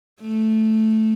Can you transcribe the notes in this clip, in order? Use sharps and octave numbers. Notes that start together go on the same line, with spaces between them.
A3